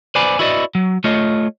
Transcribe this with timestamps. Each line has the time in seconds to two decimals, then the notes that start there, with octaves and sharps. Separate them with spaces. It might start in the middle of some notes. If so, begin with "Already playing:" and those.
0.15 B4 C5 D5 G#5 B5
0.39 E4 F#4 B4 D5 D#5
0.75 F#3
1.04 A3 F4 C#5 D#5